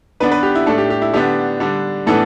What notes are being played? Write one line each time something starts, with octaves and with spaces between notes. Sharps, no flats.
D3 B3 D4 B4
B4
G4
E4
A2 A3 D4 A4
G4
G4
E4
D3 B3 D4 G4
D3 G3 D4
A2 E3 B3 D4 A4